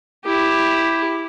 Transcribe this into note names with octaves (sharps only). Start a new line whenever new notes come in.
E4 G4